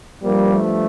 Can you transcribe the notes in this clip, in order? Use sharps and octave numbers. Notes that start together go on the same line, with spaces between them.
G2 F3 G3 A#3
A3